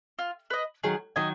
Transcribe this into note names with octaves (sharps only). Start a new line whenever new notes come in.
F4
B4 D#5
D#3 F#3 G#4
D#3 F#3 D#5 G#5